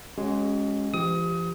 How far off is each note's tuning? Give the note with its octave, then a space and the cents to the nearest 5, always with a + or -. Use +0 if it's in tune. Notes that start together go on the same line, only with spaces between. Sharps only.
G#3 +0 C#4 -5 F#4 +35
F3 -45 G4 +0 D#6 +25